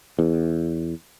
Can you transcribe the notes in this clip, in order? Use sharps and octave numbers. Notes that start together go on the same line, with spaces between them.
E2